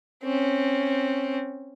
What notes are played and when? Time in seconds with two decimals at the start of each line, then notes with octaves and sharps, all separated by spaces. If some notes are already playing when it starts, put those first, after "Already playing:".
0.23 C4 C#4